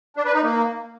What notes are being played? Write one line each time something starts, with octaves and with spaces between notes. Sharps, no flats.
D4
B4
D#4
A#3